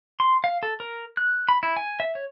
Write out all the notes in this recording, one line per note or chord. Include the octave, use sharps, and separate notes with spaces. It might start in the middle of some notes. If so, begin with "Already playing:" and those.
C6
F5
A4
A#4
F#6
B5
E4
G#5
E5
C#5